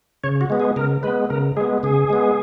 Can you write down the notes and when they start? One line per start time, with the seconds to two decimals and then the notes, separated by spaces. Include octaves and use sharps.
0.24 C#3 C#5
0.41 F#4
0.50 G#3 B3
0.60 G#4
0.76 C#3 A#4
1.03 G#3 B3 B4
1.30 C#3 A#4
1.57 G#3 G#4
1.61 B3
1.83 C#3 G#4
2.10 G#3 B3